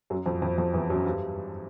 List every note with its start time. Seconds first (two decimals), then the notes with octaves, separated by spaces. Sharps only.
0.10 F#2 F#3
0.26 F2 F3
0.42 F2 F3
0.58 F2 F3
0.73 E2 E3
0.90 F#2 F#3
1.06 G2 G3